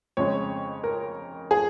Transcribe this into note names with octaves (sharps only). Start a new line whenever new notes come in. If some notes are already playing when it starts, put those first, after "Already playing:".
F2 C#3 G#3 C#5
A#4
G#4